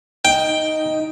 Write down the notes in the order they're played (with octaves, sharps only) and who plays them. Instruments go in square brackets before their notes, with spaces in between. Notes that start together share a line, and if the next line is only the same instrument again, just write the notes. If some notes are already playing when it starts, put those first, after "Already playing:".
[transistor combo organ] D#4 [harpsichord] G5